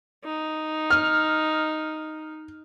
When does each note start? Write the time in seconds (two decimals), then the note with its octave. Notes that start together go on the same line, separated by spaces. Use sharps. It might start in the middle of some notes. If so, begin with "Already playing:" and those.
0.24 D#4
0.90 F6